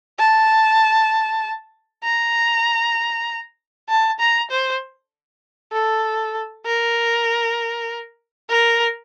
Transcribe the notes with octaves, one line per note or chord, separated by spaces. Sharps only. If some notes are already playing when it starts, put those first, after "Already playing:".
A5
A#5
A5
A#5
C5
A4
A#4
A#4